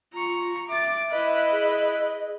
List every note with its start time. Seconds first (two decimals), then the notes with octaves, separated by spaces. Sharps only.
0.13 F4 A#5 C#6
0.69 E5 D6 A6
1.11 E4 B4 D#5
1.51 G#4